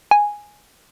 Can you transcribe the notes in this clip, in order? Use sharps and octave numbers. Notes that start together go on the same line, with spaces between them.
G#5